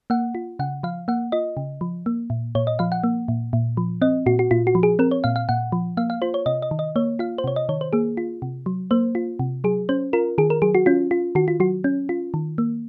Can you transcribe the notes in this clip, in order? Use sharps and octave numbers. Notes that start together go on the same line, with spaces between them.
A#3 F#5
F4
C#3 F#5
F3 F5
A#3 F#5
F4 D#5
C#3
F3
A#3
A#2
A#2 C#5
D#5
F3 F5
F#5
A#3
A#2
A#2
F3
C4 D#5
A#2 F#4
F#4
A#2 F4
F#4
F3
G#4
C4 A#4
C#5
A#2 F5
F5
A#2 F#5
F3
A#3 F5
F5
F4 C5
C#5
C3 D#5
D#5
D#3
D#5
A#3 C#5
F4 F5
C5
C3 C#5
D#5
D#3 C#5
C5
A#3 G#4
F4
C3
F#3
A#3 C5
F4
C3
F#3 G#4
C#4 C5
F4 A#4
D#3 G#4
A#4
F#3 G#4
F#4
C#4 F4
F4
D#3 F#4
F4
F#3 F#4
C#4
F4
D#3
A#3